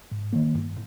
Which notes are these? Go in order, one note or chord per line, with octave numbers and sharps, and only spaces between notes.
G#2
D#3 A#3
G2